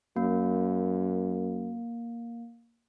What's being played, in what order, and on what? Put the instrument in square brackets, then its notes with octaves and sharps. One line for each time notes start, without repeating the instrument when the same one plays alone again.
[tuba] F#2 [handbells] A#3